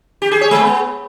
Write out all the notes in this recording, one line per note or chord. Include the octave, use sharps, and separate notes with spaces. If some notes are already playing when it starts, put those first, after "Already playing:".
G4
G#4
C#5
G#3
B3